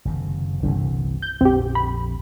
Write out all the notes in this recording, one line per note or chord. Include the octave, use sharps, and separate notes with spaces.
F#1 C3 D#3
G1 C2 C3 E3
G6
A#1 F2 D3 C4 G4
B5